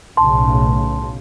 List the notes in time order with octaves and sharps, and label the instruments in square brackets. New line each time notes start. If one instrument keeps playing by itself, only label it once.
[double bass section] B1 A2 C#3 [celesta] A5 C6